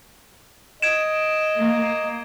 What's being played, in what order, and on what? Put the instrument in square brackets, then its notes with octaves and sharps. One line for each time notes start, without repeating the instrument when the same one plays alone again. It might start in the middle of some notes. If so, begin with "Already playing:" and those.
[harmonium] D#5 [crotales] G#6 D7 E7
[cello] A#3